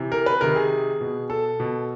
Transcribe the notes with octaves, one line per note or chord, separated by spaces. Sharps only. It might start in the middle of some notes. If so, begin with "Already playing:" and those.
Already playing: C3 E3
A#4
B4
C3 D#3 A#4
G#4
B2
A4
B2